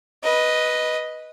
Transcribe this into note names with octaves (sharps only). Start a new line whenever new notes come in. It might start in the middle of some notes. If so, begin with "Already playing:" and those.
B4 D#5